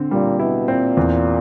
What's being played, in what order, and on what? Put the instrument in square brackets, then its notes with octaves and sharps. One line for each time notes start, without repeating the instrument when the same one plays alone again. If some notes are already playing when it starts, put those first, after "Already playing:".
Already playing: [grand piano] D3 C4
[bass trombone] A#2 [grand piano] G3
[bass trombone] B2 [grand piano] E4
[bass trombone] A#2 [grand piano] C4
[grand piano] E2